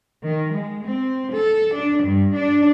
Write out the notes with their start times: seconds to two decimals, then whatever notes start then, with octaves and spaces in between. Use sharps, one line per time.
0.24 D#3
0.54 G#3
0.86 C4
1.34 A4
1.74 D4
2.03 G2
2.35 D4